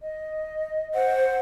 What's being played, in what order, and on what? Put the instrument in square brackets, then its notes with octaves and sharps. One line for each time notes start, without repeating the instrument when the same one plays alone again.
[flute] D#5
[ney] C5 [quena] F#5